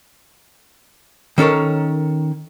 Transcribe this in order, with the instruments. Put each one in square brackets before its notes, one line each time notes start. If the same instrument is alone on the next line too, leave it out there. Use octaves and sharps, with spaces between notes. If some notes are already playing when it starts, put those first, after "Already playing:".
[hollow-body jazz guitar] D#3 C#4 A4 A#4 C#5